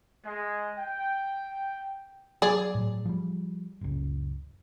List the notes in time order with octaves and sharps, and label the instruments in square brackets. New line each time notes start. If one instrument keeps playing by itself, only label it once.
[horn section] G#3
G5
[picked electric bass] F#3 [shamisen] G#4 D5
[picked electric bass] A2 F#3
F3 G3
F#1 C#2